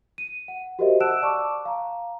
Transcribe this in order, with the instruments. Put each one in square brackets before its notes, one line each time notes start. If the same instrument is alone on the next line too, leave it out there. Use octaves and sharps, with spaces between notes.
[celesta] D#7
F#5
F#4 G4 A#4 C5 D#5 E5
F#5 A5 E6 F#6 D7 E7
D5 A5 C#6 D6
F5 A#5